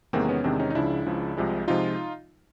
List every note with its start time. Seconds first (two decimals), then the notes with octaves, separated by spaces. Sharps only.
0.13 E2 C3 D#3 G#3 A#3 C4
0.29 B3 C#4
0.44 E2 C3 D#3 G#3 C4 D4
0.60 C#4 D#4
0.70 D#4
0.75 C#2 C#3 F3 D4 E4
1.06 C#2 C#3 F3
1.37 C2 C3 F3 G#3
1.68 C3 F3 G#3 D#4 F4